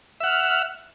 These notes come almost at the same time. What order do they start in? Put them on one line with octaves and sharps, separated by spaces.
E5 F#5 F6